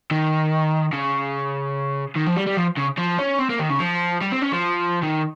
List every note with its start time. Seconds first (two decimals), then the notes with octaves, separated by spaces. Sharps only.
0.11 D#3
0.93 C#3
2.16 D#3
2.27 F3
2.37 G3
2.47 G3
2.57 F3
2.78 C#3
2.98 F3
3.19 C#4
3.39 C4
3.50 A#3
3.59 D#3
3.70 C#3
3.80 F3
4.21 G3
4.32 C4
4.42 C#4
4.52 F3
5.03 D#3